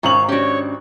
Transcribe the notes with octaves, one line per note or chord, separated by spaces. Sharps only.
G#1 C#4 C#5 F5 A#5 F#7
C#4 D4 F#4 G4 C#5